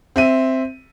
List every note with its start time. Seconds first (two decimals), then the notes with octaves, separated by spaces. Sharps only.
0.16 C4 E5 D#7